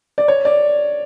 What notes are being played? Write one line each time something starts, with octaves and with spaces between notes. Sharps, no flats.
D5
C#5
D5